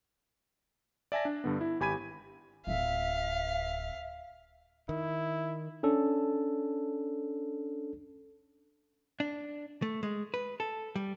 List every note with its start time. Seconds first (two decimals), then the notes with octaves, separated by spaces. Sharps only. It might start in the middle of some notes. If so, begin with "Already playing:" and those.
1.12 D5 E5 G#5 A5 A#6
1.25 D4
1.44 G2 D3 B3
1.61 E4
1.80 G#1 G4 G#5 B5 G#6 D#7
2.67 D1 F4 E5 F5
4.89 D#3 E4
5.83 C#4 D4 A4
9.20 D4
9.82 A3
10.03 G#3
10.34 B4
10.60 A4
10.96 G3